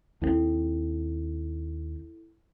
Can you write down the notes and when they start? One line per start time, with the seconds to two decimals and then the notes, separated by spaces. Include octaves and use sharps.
0.22 D#2 A3 C4 E4 A4